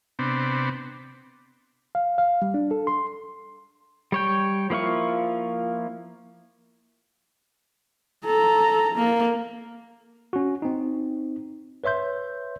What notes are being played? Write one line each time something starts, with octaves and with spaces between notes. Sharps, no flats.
C3 B3 C4 D4
F5
F5
G3
D4
A4
C6
G3 C#5 G5
F3 A#3 E4 F4 C#6
A4 A#5
A#3
C#4 F#4
C4 D#4
B4 C#5 E5 C6 G6